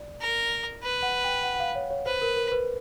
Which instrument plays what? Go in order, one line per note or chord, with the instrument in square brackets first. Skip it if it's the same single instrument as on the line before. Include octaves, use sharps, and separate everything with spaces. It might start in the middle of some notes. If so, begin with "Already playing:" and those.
Already playing: [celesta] D5
[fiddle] A#4
B4
[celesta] F#5
G5
F#5
F#5
F5
C#5
C#5
[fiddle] B4 [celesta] C5
[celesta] A#4
A#4
B4